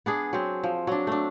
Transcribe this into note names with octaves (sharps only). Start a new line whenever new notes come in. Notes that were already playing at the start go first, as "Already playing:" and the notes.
B3 D4 G#4
F#3 C4
F3
F#3 D4
A3 D4